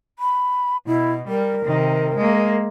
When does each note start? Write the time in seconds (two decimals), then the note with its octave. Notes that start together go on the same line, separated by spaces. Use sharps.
0.19 B5
0.87 B2 E4
1.28 G3 A#4
1.65 C3 D#3
2.16 G#3 A#3